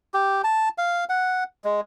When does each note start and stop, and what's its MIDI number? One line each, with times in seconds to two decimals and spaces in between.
0.14 0.42 67
0.44 0.69 81
0.78 1.04 77
1.09 1.44 78
1.64 1.81 56